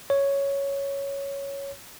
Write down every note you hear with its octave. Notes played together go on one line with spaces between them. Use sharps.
C#5